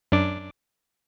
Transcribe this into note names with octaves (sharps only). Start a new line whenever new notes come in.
F#2 D4 D6